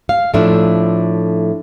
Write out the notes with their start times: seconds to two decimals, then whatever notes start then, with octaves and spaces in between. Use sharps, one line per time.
0.09 F5
0.34 A2 F3 A3 D4 E5